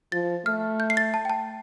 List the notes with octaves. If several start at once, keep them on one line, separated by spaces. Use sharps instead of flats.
F3 A6
A3 F6
G6
C7
A6
A5
G5
A5